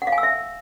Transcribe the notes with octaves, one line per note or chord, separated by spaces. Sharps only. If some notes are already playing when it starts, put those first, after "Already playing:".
F#5
F5
G#5
E6
E5